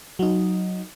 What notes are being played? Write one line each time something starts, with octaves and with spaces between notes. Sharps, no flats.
F#3 D#4